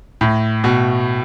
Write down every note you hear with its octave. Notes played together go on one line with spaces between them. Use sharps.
A2
B2